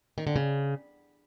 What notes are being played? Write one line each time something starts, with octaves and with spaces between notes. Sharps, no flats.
D#3
D3
C#3